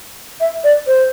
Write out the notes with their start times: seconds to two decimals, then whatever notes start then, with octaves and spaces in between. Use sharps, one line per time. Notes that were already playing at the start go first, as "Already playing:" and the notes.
0.40 E5
0.64 D5
0.87 C5